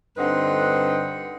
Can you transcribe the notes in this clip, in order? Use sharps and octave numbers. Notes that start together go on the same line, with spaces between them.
G2 D3 C4 D#4 B4 F#5